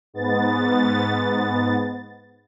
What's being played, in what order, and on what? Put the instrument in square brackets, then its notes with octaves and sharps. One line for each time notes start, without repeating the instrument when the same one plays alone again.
[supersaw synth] G#2 B3 A6